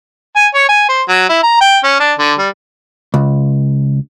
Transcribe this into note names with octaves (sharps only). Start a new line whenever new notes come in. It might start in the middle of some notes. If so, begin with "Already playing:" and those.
G#5
C#5
G#5
C5
F#3
E4
A#5
G5
C#4
D4
D3
G3
C#2